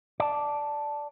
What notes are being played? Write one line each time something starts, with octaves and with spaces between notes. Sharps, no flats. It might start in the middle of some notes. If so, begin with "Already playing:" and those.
D5 A5